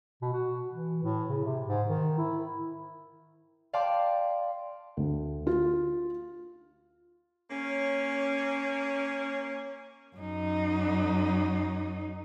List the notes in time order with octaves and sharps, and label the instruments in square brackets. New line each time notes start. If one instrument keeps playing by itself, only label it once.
[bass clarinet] B2
F#4
E3
A2
C#3
C3
G#2
D#3
E4
[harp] D5 F5 G5 A5 C6 D6
[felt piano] D2
F4
[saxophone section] A#3 C#4
[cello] F#2 D#4